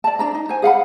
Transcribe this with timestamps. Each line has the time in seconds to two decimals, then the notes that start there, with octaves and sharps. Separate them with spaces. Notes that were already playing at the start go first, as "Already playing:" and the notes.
0.04 D5 A5
0.19 D4 D5 A#5
0.34 D#4
0.49 C5 G#5
0.62 G#4 F5 F#5 B5